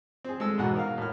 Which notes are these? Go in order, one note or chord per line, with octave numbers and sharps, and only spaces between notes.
C4 G#4
G#3 A4 E6
E2 G#2 B2 F#5
A#4 F5
A2 F6